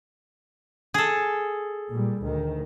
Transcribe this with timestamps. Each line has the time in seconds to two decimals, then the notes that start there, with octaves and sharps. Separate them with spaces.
0.94 G#4 A4
1.90 A#2 G3
2.23 D2 D#3